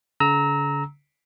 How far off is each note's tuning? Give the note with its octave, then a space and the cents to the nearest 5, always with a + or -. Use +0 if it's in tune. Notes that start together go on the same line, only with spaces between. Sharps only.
D3 -45 A#5 +0 E6 -30